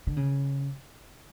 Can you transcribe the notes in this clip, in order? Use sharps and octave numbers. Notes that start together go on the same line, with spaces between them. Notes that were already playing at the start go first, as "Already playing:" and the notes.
D3
C#3